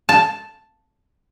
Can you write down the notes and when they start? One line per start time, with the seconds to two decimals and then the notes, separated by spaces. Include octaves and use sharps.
0.09 A5